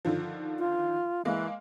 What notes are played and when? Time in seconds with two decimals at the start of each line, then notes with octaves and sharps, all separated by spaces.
0.05 D3 D#3 F3
0.59 F4
1.25 E3 G#3 A#3